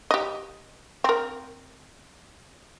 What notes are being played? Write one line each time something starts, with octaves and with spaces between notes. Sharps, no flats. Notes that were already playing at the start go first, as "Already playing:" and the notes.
G4 D#5
C4 A#4